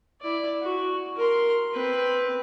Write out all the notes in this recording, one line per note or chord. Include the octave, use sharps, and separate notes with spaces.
E4 D5
F#4
A#4 C6
C4 B4